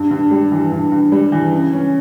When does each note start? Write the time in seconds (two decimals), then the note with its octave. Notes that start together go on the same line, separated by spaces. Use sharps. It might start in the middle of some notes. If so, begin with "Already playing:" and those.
Already playing: G2
0.11 G2
0.31 G3
0.51 E3
0.72 G2
0.92 G2
1.12 G3
1.32 E3
1.53 C#3
1.73 C#4